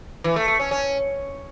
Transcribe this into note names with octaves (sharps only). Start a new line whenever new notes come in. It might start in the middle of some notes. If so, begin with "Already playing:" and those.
E3
A3
A3
C#4
C#4